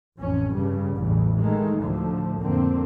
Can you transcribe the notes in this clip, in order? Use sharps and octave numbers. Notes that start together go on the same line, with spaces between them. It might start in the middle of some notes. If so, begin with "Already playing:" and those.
A1 F2 C#4
G2 C#3 G3
A1 E2
D#3 G#3 A3
D2 A2 D3 F3 A3
F2 D3 A#3 C4